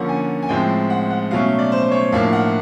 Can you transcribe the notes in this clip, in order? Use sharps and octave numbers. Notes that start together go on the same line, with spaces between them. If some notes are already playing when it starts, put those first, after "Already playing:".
Already playing: D3 F3 A#3 C#4 F#5
G#5
G#5
A2 F3 G#3 C4 G5
F#5
F#5
B2 F#3 A3 C#4 F5
D5
C5
C5
C#5
A2 F3 A#3 D4 F5
F#5